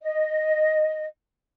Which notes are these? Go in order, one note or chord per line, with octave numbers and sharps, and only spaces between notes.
D#5